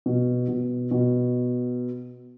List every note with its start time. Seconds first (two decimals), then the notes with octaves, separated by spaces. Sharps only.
0.06 B2
0.48 B2
0.91 B2